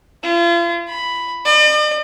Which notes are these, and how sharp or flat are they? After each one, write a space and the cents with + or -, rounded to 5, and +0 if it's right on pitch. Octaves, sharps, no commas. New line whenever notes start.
F4 -40
B5 +5
D5 +45